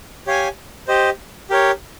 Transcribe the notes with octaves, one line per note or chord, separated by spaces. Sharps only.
G4 C#5 F5 G#5
G4 C5 D#5
G4 A#4 C#5